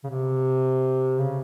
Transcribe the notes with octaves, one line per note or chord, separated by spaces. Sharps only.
C#3
C3
C#3